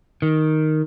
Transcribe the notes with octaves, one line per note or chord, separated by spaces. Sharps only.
D#3